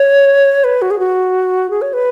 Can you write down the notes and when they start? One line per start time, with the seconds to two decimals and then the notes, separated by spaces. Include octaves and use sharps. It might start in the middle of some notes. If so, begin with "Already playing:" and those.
Already playing: C#5
0.64 B4
0.82 F#4
0.91 G#4
0.99 F#4
1.70 G#4
1.82 C#5
1.93 B4